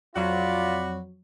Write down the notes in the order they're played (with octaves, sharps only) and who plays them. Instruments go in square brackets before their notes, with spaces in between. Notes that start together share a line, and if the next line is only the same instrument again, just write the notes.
[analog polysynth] F2 F#3 [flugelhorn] F4 [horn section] F#4 D5 B5